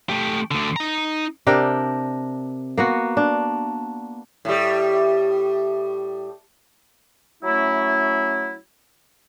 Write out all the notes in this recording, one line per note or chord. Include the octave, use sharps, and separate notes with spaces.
A3 G4
D2 D3
D#4 A#5
C3 D4 A#4 G5
A#3 B3 F#4
D4
A2 G3
F#3 A3 C#4 E4